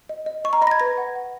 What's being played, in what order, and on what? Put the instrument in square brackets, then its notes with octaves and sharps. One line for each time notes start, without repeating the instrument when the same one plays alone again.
[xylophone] D#5
D#5
D#5 C#6
A#5
D#5 B5
A#6
G#6
B4 A#6
F#5
F#5